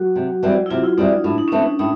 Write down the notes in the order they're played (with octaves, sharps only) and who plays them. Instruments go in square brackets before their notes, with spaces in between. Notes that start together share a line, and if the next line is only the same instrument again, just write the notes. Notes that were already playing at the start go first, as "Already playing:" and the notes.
Already playing: [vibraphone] F#3 F#4
[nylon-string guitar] C3
E3 G3 C4
[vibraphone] E4
[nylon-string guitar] C3 [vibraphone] F4
[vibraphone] E4
[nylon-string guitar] E3 G3 C4 [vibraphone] D#4
[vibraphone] D4
[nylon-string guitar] A2 [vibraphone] D4
[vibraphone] D#4
C#4
[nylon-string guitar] E3 A3 C4 [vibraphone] D4
[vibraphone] D#4
[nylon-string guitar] A2 [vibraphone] D#4